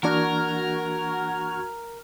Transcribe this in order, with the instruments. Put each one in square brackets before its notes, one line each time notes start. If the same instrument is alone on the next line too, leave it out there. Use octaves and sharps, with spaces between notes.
[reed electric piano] E3 A#3 D4 [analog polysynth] F#4 F6 G#6 [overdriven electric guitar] A#4